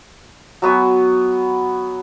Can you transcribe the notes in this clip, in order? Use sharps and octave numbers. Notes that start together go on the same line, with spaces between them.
F#3 B3 G#5